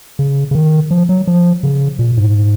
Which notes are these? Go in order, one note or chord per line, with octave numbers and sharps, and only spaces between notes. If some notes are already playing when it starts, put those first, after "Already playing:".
C#3
C#3
D#3
F3
F#3
F3
C#3
A#2
G#2